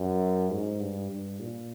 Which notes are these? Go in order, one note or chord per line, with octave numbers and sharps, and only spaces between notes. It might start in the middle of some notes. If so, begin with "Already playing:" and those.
Already playing: F#2
G#2
G2
G2
A#2